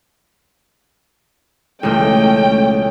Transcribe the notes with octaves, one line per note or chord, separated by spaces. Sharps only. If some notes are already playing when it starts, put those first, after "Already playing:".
E1 C#2 A3 C#4 G5